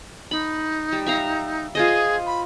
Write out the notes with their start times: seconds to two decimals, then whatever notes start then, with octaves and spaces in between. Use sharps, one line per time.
0.31 D#4 B5
0.93 G3
1.06 E5 F5 A#5
1.75 F4 G#4 C5 D#5
2.26 B5